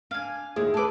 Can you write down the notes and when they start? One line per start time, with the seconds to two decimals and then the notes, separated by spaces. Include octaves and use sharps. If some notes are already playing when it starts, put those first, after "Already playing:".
0.11 D4 F5 G#5
0.56 D#2 A#2 E4 G#4
0.74 A3 A4 B4 D6